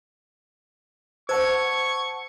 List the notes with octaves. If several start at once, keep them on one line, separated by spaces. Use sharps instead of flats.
C5 F#5 A5 C#6 E6 G#6